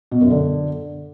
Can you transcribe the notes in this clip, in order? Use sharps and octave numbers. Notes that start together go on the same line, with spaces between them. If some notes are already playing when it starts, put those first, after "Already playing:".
B2
F#2
D3